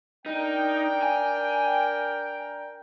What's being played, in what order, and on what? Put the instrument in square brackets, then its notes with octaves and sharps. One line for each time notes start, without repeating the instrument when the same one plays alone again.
[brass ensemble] D4 A#4 G5 [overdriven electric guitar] D#4
[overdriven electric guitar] G#5